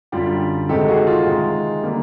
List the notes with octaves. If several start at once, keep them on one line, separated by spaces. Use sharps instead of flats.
F#2 D3 G3 F4 G4
C3 D#3 G#3 G4 A4
A4
F#4 G#4
F4
C3 D#3 G#3
D3 G3 A#3